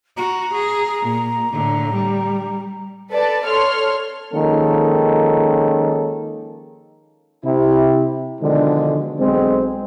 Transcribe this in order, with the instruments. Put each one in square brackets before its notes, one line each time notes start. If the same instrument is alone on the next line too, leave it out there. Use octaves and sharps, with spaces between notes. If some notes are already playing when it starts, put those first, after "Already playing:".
[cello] F#4 [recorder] A#5
[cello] G#4
A#2
A2 D3
G3
[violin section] A4 B4 D5 A5
A4 C#5 C6 F6
[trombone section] D#3 F3 G#3 A#3 C#4 A4
C3 E4
B2 D3 D#3 F3 G#3
B1 G#3 C4